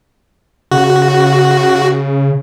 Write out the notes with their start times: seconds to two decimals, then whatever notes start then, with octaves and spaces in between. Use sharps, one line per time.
0.71 C#3 F#4